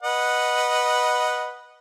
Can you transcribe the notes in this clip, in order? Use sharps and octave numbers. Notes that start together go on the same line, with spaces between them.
B4 D#5 F#5